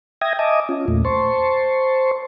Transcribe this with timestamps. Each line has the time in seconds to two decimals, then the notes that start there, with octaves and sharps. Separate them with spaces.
0.22 E5 G5 D#6 G#6 A#6
0.39 D#5 E5 G#5 A5 D6 D#6
0.69 C#4 F4
0.88 E2 A#2 A3
1.05 C5 A5 C6 C#6